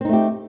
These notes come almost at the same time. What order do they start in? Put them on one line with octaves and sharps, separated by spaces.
C4 D#4 A3 G4